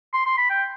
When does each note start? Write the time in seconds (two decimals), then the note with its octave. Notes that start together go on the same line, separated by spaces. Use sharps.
0.13 C6
0.26 C6
0.37 B5
0.50 G5